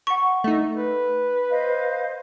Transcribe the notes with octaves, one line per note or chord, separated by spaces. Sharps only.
F#5 C#6
A3 D#4
B4
C5 D#5 F5